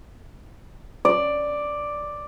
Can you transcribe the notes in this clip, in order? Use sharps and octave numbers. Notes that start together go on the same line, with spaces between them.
D5